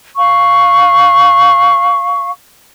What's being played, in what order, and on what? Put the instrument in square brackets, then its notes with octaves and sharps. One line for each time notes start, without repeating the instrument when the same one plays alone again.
[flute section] F5 C#6